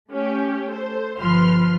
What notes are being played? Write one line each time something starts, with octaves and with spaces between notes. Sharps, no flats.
A3 C#4 G4
A4 C5
G1 F3 B4 C6 F6